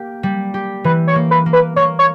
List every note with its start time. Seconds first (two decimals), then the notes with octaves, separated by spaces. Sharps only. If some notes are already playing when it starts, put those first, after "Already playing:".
Already playing: A#3 G4
0.23 G3
0.54 G4
0.84 E3 B4
1.08 C#5
1.15 A#3
1.31 B4
1.46 A#3
1.53 B4
1.76 A#3 C#5
1.99 C#5